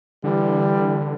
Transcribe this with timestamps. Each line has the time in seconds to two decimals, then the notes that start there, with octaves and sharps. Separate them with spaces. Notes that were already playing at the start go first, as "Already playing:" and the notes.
0.24 D3 E3 G3